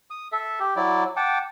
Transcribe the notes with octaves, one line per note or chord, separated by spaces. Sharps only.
D#6
A4 E5
G4
F#3 E4 D5
F#5 G5 A5 D6